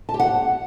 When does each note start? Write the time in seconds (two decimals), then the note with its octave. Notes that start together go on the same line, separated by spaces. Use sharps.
0.09 A5
0.14 G4
0.20 F#5